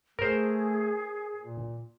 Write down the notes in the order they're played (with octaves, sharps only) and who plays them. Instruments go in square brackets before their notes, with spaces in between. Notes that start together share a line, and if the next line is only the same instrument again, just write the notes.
[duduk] A3 [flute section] G#4 [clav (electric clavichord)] A#4 C5
[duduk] A#2